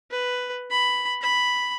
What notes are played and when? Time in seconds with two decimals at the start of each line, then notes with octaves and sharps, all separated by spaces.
0.12 B4
0.71 B5
1.22 B5